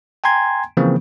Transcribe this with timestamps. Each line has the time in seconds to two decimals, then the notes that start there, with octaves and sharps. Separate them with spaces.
0.24 G5 G#5 A#5 C6 G#6
0.77 C#3 E3 F3 A#3 C4